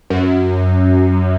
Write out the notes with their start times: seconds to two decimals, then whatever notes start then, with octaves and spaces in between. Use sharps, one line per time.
0.10 F#2